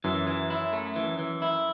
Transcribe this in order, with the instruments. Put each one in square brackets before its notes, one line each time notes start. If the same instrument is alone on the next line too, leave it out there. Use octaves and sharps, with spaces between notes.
[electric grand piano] F#2 [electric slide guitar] E3
[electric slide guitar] E3
E4
A3
E3
E3
E4